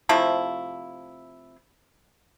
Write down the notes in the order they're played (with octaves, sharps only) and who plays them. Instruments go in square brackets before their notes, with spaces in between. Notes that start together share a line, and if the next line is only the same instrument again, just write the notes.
[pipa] C3 F3 A3 E4